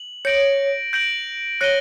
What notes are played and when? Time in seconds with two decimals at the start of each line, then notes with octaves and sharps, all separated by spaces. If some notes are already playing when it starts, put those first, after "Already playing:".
Already playing: F#7
0.25 C#5 G6 A#6 D7 F#7
0.93 G6 A#6 D7 F#7
1.61 C#5 F#6 A#6 D#7 G7